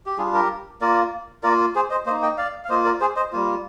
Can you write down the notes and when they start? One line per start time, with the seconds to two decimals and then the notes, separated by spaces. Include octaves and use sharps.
0.06 G4
0.18 G3 D4 F4 G#4
0.34 G4 A#4
0.81 A#3 F4 A#4 D5
1.43 A#3 F4 A#4 D5
1.75 G#4 C5
1.90 C5 D#5
2.06 A#3 C5 D#5
2.11 D#4
2.22 D#5 G5
2.38 D5 F5
2.65 F5
2.69 A#3 F4 C5 D#5
2.85 A#4 D5
3.00 G#4 C5
3.16 C5 D#5
3.33 G3 A#3 F4